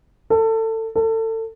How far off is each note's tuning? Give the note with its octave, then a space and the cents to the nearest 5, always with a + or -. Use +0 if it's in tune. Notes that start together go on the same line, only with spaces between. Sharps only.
A4 +25
A4 +30